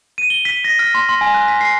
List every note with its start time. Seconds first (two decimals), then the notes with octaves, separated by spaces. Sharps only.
0.18 D#7
0.30 G7
0.45 B6
0.64 A#6
0.79 F6
0.94 C6
1.09 C6
1.21 G#5
1.34 F#6
1.48 B6
1.61 C7